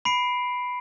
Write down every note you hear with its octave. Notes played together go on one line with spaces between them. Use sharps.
B5 C7 D7